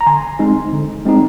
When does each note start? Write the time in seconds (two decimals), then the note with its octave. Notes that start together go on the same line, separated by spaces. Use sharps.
0.01 A#5
0.06 D3 G#5 C6
0.39 G#3 C4 D#4
0.72 D3
1.05 G#3 C4 D#4